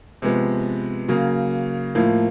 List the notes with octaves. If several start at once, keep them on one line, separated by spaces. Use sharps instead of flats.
C3 F3 G#3 B3
C#3 F#3 A#3
A2 F3 A#3